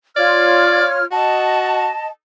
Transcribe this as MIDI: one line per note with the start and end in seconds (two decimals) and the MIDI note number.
0.16 1.04 65
0.16 1.04 73
0.16 0.86 74
0.16 1.04 89
1.11 1.88 66
1.11 2.10 75
1.11 2.10 81